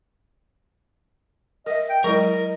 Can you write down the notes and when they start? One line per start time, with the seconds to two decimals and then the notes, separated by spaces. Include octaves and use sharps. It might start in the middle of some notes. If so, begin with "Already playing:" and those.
1.66 A#4 D#5 E5
1.90 G5
2.04 F#3 G#3 E4 A#4 D#5